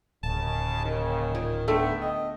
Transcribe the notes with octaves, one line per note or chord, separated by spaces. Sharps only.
D1 D#2 C#3 A5
D#3
A#2
D3 A3 B3 E5 G5
D#5